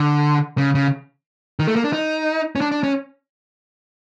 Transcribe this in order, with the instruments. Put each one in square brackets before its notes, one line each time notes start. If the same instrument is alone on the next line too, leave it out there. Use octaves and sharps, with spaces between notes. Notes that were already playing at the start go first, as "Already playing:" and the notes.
Already playing: [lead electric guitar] D3
C#3
C#3
D#3
A3
A#3
D4
D#4
C#4
D4
D4
C#4